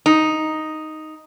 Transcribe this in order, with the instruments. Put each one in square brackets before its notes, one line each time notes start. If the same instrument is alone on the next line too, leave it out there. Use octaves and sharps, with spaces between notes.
[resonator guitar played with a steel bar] D#4